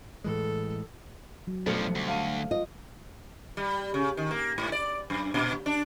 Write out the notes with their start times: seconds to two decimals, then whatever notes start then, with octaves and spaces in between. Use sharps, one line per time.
0.24 A2 E3 G#3 A4
1.47 F#3
1.67 B1 G2 F3 G3 A3 A4 C5 C#7
1.95 D2
2.08 F5 A5 D#7
2.51 F4 D#5
3.57 G3
3.94 C#3
4.17 D#3
4.31 A#3
4.58 G#2
4.72 D5
5.10 F#2
5.34 A#2
5.66 D4